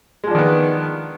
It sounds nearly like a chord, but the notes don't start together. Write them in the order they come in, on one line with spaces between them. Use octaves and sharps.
G#3 F3 D4 D#3 B3